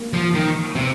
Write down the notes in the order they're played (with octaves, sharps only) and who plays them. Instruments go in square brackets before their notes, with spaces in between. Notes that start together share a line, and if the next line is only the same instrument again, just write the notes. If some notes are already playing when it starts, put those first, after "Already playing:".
Already playing: [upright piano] A#3
[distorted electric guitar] F3
D#3
[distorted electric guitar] C3 [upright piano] C4